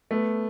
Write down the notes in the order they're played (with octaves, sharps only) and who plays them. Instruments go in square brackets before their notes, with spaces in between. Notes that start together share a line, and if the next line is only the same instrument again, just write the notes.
[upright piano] A3 B3